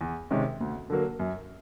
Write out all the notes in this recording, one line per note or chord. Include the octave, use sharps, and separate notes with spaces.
E2
C3 D#3 G#3 C#4
D2
D3 F#3 A#3
F#2